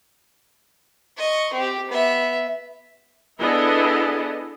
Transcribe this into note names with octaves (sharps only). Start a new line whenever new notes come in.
D#5 C#6
C4 G4
B3 E5
B3 D4 E4 G#4 A4 D#5